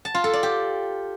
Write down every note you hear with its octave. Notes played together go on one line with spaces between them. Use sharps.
A5
F4
A4
D5
G4